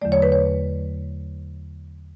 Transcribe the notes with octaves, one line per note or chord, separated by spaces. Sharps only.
E2 D3 F#3 A3 D5
C#5
B4
C#5